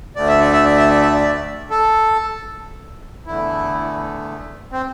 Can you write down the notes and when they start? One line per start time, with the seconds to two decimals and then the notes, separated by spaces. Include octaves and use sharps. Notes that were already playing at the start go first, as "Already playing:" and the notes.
0.15 D2 D3 A3 D5
0.27 E5
0.40 D5
0.52 E5
0.65 D5
0.77 E5
0.89 D5
1.01 E5
1.14 D5
1.71 A4
3.26 E2 D3 A3 E4
4.72 C4